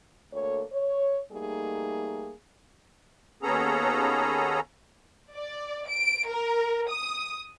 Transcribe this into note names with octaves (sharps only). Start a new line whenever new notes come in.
D2 A#3 A4 C#5
C#5
G3 A3 A#3 D#4 G#4
D#2 B3 C#4 G#4 A4 A#5
D5
D7
A#4
D#6